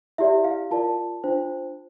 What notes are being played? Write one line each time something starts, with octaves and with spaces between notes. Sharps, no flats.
E4 G4 D5 E5
F5
F4 A#4 D5 A5
D4 F4 C5